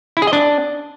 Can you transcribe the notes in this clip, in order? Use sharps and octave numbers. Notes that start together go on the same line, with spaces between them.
E4
G#4
D#5
D4